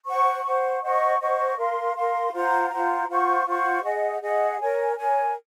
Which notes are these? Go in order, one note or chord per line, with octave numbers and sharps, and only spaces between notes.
C5 F#5 C#6
C5 F#5 C#6
C5 D#5 F#5 C#6
C5 D#5 F#5 C#6
A#4 F5 C6
A#4 F5 C6
F4 C5 F#5 A#5
F4 C5 F#5 A#5
F4 C5 F#5 C#6
F4 C5 F#5 C#6
G#4 D#5 F#5
G#4 D#5 F#5
A#4 C#5 G#5
A#4 C#5 G#5